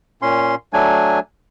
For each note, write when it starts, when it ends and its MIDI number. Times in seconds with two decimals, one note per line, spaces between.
0.22 0.55 46
0.22 0.55 61
0.22 0.55 84
0.73 1.19 54
0.73 1.19 57
0.73 1.19 62
0.73 1.19 80